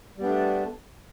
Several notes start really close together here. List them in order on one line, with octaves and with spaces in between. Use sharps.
G3 B3 D4 A3